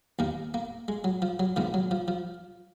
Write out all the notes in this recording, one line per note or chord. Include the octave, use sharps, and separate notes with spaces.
D#2 D#3 A#3
A#3
G#3
F#3
F3
F#3
A#1 G#2 D#3 F3
F#3
F3
F3